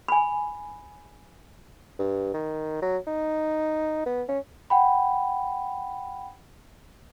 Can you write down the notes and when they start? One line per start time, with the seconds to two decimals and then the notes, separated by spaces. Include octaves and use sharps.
0.08 G#5 B5
1.99 G2
2.34 D#3
2.82 F#3
3.07 D#4
4.06 B3
4.29 C#4
4.70 F#5 G5 B5